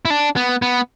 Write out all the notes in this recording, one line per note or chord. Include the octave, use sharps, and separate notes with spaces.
E4
D4
B3
B3